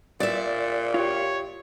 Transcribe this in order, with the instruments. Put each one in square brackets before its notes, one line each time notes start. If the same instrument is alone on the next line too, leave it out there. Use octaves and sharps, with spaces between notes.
[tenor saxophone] A#2 [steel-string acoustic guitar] D5 E5
[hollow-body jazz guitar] F4 G4 [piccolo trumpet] C#5